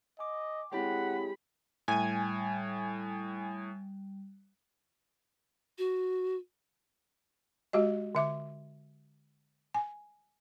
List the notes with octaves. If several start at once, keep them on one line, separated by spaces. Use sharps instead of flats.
D#5 G#5 D6
G#3 C4 E4 G4 C#5 F#5 B5
A2 G3 G#5
F#4
G#3 F#4 G4 D#5
D3 E5 D6
G#5